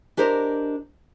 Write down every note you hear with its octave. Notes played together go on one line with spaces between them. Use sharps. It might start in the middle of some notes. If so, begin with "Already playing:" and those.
D4 G4 A#4 C5 D#5